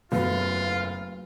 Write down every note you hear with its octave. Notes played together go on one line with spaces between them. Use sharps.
F#1 E2 F#3 A3 F4 B4 F5